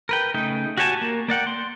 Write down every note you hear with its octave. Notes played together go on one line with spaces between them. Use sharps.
A#4 B4 G5
C#3 A3 D#4 G5
F#4 G4 C#5 G#5 A5
A#3
A#3 D5 F#5 G5
C6